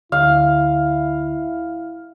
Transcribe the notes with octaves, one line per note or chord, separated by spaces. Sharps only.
D2 E4 F5